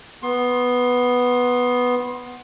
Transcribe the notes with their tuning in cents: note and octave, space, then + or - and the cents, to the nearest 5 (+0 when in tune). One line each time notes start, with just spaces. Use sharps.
B3 +0 C6 +25